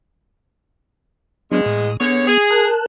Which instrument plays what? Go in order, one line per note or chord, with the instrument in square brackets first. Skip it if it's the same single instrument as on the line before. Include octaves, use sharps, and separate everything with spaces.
[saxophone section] E2 G#3 [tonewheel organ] F#3 B3 D4
[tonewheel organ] A2 D#6
[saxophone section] D3 G#4 C#5 [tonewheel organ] B3
[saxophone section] G#4
[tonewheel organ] A#4 A5 F#6